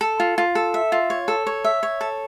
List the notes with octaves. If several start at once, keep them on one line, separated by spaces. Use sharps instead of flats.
A4
F4
F4
A4
E5
F4
C#5
A4
C#5
E5
C#5
A4